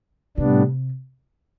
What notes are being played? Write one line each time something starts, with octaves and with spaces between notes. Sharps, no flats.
A2 C3 G3 B3 D4